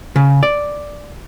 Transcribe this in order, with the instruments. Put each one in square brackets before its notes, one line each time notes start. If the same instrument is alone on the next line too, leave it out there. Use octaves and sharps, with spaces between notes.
[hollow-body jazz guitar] C#3
D5